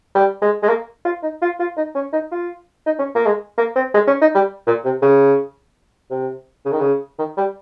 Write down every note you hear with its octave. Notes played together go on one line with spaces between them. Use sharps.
G3
G#3
G#3
A#3
F4
D#4
F4
F4
D#4
C#4
D#4
F4
D#4
C#4
A#3
G#3
A#3
C4
G#3
C#4
D#4
G3
A#2
C3
C#3
C3
C#3
D#3
C#3
D#3
G3